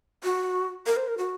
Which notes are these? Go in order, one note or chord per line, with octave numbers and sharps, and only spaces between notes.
F#4
A#4
C5
A#4
F#4